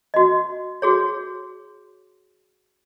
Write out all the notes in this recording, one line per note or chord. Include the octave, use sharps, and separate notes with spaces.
F#4 D#5
F#4 G#4 C#5